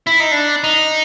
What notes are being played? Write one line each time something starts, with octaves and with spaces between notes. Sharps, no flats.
E4
D#4
D4
D#4